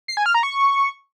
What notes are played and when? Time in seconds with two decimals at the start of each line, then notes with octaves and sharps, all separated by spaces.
0.08 C7
0.17 G#5
0.26 F6
0.34 A#5
0.43 C#6